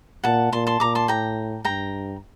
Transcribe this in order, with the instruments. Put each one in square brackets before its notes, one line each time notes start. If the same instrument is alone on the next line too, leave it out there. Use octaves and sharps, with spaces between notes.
[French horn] A#2 [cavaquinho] F#5 A5
[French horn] A#2 [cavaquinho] A5 C6
[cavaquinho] A5 C6
[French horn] A#2 [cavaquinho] A#5 D6
[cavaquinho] A5 C6
[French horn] A2 [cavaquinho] G5 A#5
[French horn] G2 [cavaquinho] G5 A#5